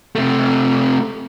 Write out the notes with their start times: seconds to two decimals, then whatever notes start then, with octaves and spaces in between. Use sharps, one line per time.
0.15 C3 A3